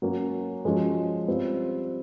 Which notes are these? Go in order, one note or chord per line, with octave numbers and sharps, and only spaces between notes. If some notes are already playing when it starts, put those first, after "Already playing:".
F#3 A#3 C#4
F3 G#3 C#4 F#4
G3 C4 F4